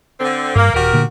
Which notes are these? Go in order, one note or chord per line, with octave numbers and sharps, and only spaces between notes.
D3 C4
G2 A#3
D#1 F#4 G4 A#4
A#2 D3 A#3